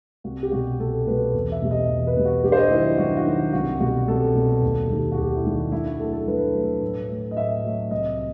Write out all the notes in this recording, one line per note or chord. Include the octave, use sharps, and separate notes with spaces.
C2 F#4
G4
B2 G3 F#4
C2 A4
B2 G3 B4
E2
E5
B2 G3
D#5
E2
B4
B2 G3
F#4
G2 G4
C5
D#5
D#3 E4
F#3
E4
G2 F#4
F#4
D#3 F#3
C2 F#4
B2 G3 F#4
C2 A4
B2 G3
D#2
D#3 G3
F#4
D#2 G4
E4
D#3 G3
F#4
G2 E4
F#4
F#3 A3 A4
A4
G2 B4
F#3 A3
A2
F#3 A3
D#5
A2 E5
F#3 A3
C2 D#5